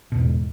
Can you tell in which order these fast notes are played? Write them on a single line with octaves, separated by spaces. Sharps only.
B2 E2 G#2